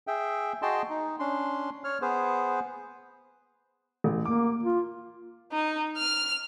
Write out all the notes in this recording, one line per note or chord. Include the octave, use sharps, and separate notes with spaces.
G#4 E5 G5
F#4 G#4 D#5 G5 A5 C6
D#4
C#4 D4 C6
C#5 F6
B3 G#4 B4 C5
A1
A#3 D6
F4
D#4
F6